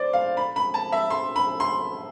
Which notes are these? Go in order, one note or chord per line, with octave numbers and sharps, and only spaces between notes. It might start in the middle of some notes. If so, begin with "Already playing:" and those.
Already playing: C5 D5
F5
B5
B5
A5
E5
C6
B5
C6